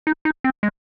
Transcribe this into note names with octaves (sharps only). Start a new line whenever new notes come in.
D#4
D#4
C4
G#3